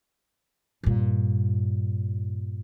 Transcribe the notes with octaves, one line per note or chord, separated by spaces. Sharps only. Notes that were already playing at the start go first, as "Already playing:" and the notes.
G2 A#2